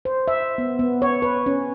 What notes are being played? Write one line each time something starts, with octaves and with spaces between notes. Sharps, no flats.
C5
E5
B3
B3
C#5
B4
C#4